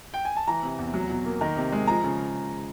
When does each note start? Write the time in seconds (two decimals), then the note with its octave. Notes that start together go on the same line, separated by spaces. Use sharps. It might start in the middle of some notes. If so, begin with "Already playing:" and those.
0.14 G5
0.25 G#5
0.37 A5
0.48 E3 A#5
0.63 C3
0.79 E2
0.94 F#3
1.10 B2
1.25 A#3
1.41 D#3 A#5
1.56 C3
1.72 G#3
1.87 F3 A#5
2.04 C#3